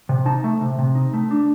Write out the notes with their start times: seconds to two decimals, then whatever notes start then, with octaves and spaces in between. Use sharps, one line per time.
0.09 C3
0.26 D#4 A5
0.44 A3
0.61 C3
0.79 C3
0.95 D#4
1.14 A3
1.31 D4